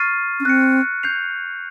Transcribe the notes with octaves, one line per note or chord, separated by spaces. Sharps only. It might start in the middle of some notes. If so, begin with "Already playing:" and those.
Already playing: C#6 F6 A6 C7 D#7
C#4
C4 F#6 A#6 C#7
G6 C7 F7